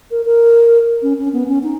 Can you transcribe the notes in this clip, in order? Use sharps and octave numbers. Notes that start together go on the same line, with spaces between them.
A#4
A#4
C#4
C#4
B3
C#4
D#4